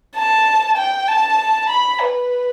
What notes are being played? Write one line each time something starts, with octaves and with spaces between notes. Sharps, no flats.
A5
G5
A5
B5
B4